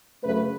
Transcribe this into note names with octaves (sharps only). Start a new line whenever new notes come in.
F#2 C#3 A3 B4